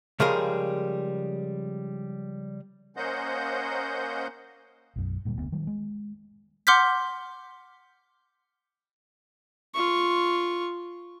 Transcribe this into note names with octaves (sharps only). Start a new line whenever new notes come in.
C#3 F3 G3 G#3 G#4 A#4
A#3 C#4 C5 D#5 F#5 G6
B1 F#2
D2 A#2 G3 A#3
F1 D2 D3 B3
D#3 F#3 G3
G#3
F#5 C6 D6 F6 G6 B6
F4 C#6